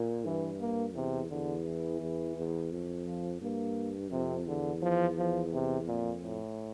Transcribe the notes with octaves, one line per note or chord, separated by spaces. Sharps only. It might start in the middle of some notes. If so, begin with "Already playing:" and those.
Already playing: A#2
G2 E3
A#3
E2 C3
E2 D3
E3
E2
E2
F2
F3
G2 A#3
F2 C3
E2 D3
F3
F3
C3
F2 A#2
A2